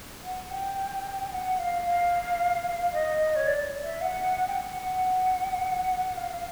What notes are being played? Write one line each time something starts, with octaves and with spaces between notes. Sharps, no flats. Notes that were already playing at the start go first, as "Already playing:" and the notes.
F#5
G5
F#5
F5
F5
D#5
C#5
D5
E5
F#5
G5
F#5
F#5
F5